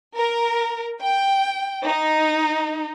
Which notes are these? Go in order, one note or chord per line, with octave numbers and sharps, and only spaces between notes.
A#4
G5
D#4